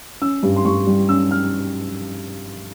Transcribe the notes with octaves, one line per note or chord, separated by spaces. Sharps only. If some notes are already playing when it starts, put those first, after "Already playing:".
C#4 E6
G2
C6
G2 C#6
G3
C#4 E6
F6